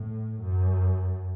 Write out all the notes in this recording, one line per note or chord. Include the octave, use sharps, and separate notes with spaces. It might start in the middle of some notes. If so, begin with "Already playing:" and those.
Already playing: A2
F#2